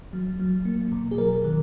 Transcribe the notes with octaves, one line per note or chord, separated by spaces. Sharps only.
F#3
F#3
A#3
B2
G#4
F#3 A#4
D#3